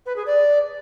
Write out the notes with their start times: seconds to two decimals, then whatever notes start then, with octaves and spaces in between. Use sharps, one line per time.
0.06 B4
0.16 G#4
0.26 D5